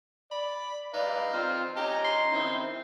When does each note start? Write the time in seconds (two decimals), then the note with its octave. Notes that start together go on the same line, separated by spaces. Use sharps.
0.32 D5 B5
0.94 D#4 B4 D5 F5
1.33 C4 F4 F6
1.76 C#4 G4 D#5 A#5
2.05 C6
2.32 D#3 C4 E4